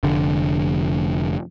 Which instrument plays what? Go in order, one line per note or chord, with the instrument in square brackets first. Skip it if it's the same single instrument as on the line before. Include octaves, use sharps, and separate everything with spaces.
[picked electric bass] F1 D3